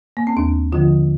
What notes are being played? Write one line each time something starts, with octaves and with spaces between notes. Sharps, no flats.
A#3
C4
D#2 D4
D3 F3 G#3 F4